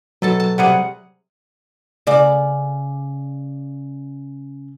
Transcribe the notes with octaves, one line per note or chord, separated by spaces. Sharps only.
B2 F#3 A4 A5
A5
C3 G3 G#4 F#5
C#3 D5